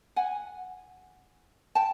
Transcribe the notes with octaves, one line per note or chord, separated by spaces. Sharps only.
F#5 G#5
G5 A5